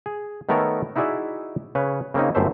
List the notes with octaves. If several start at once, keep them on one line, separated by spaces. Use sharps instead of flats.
G#4
D#3 A3 B3 A4 A#4 C#5
D#4 E4 F#4 G#4 D5 E5
C#3 B4 C#5
C#3 A#3 C4 C#4 D#4
G1 F#2 A2 A3 C5 E5